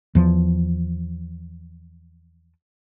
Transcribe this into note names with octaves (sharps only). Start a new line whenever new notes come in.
E2 F3